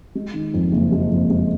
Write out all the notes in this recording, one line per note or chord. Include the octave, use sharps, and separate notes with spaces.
G#3
D#3
F2
F#1
G#3
F2
G#3